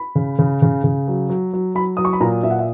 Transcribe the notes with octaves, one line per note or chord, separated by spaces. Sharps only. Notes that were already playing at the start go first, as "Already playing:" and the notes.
Already playing: B5
C#3
C#3
C#3
C#3
F#3
F#3
F#3
F#3 B5
F#3 D#6
C#6
B5
A#2 A#5
A#2 E5
F#5
E5